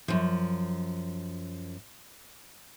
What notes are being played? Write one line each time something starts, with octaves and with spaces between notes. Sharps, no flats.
F#2 F3